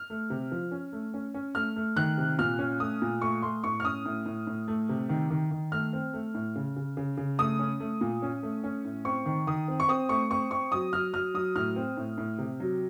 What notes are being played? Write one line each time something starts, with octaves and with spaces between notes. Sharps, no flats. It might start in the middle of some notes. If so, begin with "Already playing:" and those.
Already playing: F6
A3
C3
F3
C#4
A3
C#4
C#4
A3 F6
A3
D#3 F#6
C3
A#2 F6
C#4
A3 D#6
A#2
A3 C#6
A3 C6
A2 C#6
F6
C#4 D#6
A2
A2
A2
A3
C3
D#3
D#3
D#3
A3 F6
C4
A3
A2
C#3
C#3
C#3
C#3
A3 D#6
C#4
A3
A#2
C#4
A3
C#4
A2
C4 C#6
D#3
D#3 D#6
C4
C#6
C4 D#6
A3 C#6
C4 C#6
C4 C#6
F#3 D#6
F#3 F6
F#3 F6
F#3 D#6
A2 F6
C4
A2
A2
C3
F#3